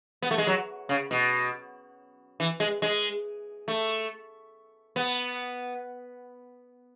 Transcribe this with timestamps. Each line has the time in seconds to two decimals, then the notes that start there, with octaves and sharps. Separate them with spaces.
0.22 B3
0.31 A3
0.38 G#3
0.47 F#3
0.89 C#3
1.11 B2
2.40 E3
2.60 G#3
2.82 G#3
3.68 A3
4.96 B3